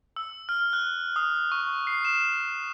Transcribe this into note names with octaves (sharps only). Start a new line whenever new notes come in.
E6
F6
F#6
D#6
C#6
C7
E7